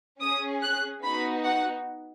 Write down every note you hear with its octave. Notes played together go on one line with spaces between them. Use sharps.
C#4 G#4 D#6
F#6
B3 D#4 F#4 B5
F#5